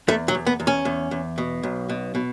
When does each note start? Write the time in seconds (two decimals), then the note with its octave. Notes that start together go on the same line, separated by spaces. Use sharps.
0.08 E2 A3
0.28 F#3
0.35 E2
0.47 B3
0.60 E2
0.67 C#4
0.85 E2
1.11 E2
1.38 B2
1.63 B1
1.89 B2
2.15 B2